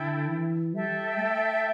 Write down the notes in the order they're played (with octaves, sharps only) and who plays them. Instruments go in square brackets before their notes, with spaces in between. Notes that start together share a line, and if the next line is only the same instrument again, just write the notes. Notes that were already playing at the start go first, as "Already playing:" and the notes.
Already playing: [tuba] D3 [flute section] E4 A4 G5
[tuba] E3
[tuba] G3 [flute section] A4 E5 G5
[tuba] A3